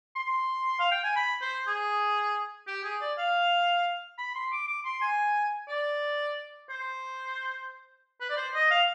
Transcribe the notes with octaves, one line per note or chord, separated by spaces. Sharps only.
C6
F5
G5
G#5
B5
C5
G#4
G4
G#4
D5
F5
B5
C6
D6
D6
C6
G#5
D5
C5
B4
D5
C5
D#5
F5